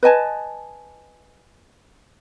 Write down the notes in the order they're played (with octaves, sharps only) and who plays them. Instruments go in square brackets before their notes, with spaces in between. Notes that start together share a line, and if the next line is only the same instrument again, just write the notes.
[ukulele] B4 D#5 G#5 A5